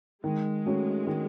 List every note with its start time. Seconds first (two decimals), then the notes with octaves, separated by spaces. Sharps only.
0.24 D#3 G#3
0.66 F#3 A3 C#4
1.07 D#3